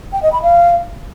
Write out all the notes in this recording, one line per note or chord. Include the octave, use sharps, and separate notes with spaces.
G5
D#5
B5
F5